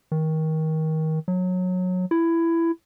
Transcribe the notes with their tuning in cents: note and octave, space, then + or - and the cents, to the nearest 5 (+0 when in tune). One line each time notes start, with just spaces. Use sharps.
D#3 +25
F#3 -20
E4 +15